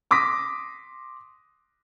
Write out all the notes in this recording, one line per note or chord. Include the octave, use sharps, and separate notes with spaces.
C6 D6 D#6 A#6 B6